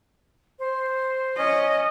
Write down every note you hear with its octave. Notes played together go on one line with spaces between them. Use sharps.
C5
C#4 D#5